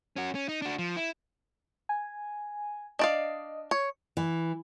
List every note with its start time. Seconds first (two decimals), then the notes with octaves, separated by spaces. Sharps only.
0.16 C#4 F#4
0.35 C#4
0.49 D#4
0.62 D4 F#4
0.79 F3
0.96 E4
1.89 G#5
2.99 D4 D5 D#5 F5
3.71 C#5
4.17 E3